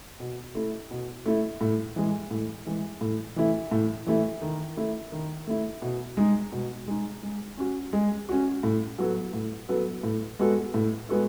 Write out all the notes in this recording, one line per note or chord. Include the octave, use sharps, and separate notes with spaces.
B2
A3 E4
B2
A3 E4
A2
E3 G#3
A2
E3 G#3
A2
E3 A3 E4
A2
E3 A3 E4
D#3
A3 E4
D#3
A3 E4
B2
G#3 D#4
B2
G#3 D#4
G#3
C#4 F#4
G#3
C#4 F#4
A2
F#3 B3 F#4 A4
A2
F#3 B3 F#4 A4
A2
G#3 B3 F#4 A4
A2
G#3 B3 F#4 A4